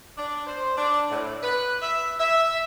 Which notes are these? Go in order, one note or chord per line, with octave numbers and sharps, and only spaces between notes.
D4
C5
D4
A2
B4
E5
E5